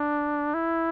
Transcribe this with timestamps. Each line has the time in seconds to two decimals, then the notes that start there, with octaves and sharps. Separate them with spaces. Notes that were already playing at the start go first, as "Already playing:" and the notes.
Already playing: D4
0.54 E4